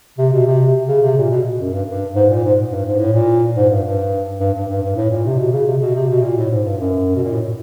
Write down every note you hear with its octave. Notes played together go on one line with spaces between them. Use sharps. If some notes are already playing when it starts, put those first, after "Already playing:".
C3
B2
C3
C#3
C3
A#2
B2
F#2
G2
G2
G#2
A#2
G#2
G2
G#2
A2
A#2
G#2
G2
G2
G2
G2
G2
G2
A2
A#2
C3
B2
C#3
C3
B2
C3
B2
A#2
A2
G#2
G2
F#2
B2
A#2
A2